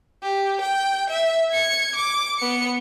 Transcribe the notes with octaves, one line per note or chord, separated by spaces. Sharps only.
G4
G5
E5
G#6 C#7
D6
B3 C#7